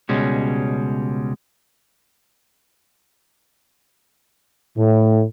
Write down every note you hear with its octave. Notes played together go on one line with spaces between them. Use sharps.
C#2 B2 G3 G#3 C#4
A2